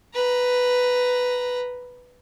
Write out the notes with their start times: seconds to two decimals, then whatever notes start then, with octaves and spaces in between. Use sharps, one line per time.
0.15 B4 A#5